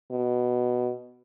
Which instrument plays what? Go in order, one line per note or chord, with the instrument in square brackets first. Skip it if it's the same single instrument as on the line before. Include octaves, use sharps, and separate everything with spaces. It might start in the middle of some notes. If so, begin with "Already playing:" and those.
[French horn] B2